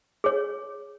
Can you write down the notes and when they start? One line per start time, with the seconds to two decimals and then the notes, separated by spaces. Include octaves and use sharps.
0.24 G#4 C#5